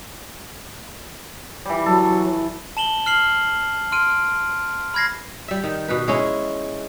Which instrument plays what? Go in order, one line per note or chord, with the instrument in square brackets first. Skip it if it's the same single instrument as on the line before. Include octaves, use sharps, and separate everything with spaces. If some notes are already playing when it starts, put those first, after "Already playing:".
[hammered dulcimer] E3 G3
[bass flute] F#3 [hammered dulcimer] A4
[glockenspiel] A5 E7 F#7 G7
F6 C7 F#7
C6 F6 D7 D#7
B5 F6 G#6 A#6 C7
[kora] G3 E5
D#3
B2 B4
G#3 C#4 E4